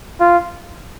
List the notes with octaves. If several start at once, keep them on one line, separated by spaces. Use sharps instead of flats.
F4